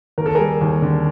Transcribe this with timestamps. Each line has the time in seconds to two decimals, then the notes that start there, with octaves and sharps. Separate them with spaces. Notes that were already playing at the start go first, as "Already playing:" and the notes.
0.18 D#2 A#4
0.26 A4
0.35 G3 G#4 A#4
0.61 D#2
0.82 D3